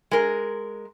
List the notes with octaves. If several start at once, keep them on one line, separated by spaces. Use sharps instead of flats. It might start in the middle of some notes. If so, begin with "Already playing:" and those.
G#3 A#4